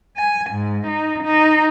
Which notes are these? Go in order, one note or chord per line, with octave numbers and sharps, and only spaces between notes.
G#5
G#2
D#4
D#4